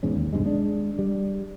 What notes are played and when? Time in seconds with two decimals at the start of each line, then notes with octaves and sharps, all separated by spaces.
0.03 E1 E2 G#2 C#4
0.16 D#2
0.33 B1 G2 C3 G#3
0.45 G#3 D4
0.99 G3